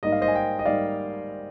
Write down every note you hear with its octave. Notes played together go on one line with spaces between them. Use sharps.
G#2 G3 A#3 D#5
F5
C5 D#5
G#5
D#5 G5
D#5
G#2 G3 A#3 D5 F5